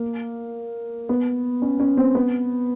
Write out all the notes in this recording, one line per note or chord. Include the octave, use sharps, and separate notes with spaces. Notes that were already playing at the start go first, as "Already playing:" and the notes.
Already playing: A#3
B3
C#4
C#4
C4
B3